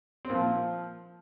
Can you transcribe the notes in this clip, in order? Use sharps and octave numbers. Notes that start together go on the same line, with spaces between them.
C4
A#2
F3